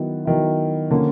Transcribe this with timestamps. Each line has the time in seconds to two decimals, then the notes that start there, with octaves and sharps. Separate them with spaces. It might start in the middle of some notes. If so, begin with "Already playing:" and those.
Already playing: D#3 F#3 B3 E4
0.25 D#3 F#3 B3 E4
0.91 D3 F3 A#3 C#4 F4